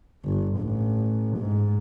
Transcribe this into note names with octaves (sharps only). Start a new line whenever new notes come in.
G1
A1
G#2